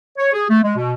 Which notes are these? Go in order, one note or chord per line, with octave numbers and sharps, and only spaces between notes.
C#5
G#4
A3
G#3
B2